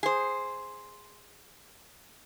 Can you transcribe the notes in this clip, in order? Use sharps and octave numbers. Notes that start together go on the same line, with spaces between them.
G#4 C5